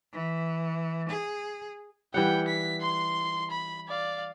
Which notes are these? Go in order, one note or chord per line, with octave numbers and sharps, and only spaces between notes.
E3
G#4
E3 G3 F#5 G5
B6
C6 C7
B5
D5 F5